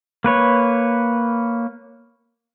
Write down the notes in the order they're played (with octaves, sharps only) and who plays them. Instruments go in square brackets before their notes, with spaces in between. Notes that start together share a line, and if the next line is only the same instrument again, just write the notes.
[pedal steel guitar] A#3 B4 C#5